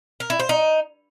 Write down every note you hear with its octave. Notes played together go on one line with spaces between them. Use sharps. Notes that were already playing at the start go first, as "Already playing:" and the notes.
A#4
E4
C5
D#4